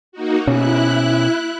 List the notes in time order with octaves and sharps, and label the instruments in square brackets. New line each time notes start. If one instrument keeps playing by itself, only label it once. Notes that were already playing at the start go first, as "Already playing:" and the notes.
[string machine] A#3 D#4 F#4
[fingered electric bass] B2 C#4 [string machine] E4 F#6